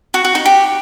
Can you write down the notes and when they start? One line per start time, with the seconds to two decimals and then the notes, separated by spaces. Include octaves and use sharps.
0.14 F#4
0.25 F#4
0.35 D#4
0.45 G4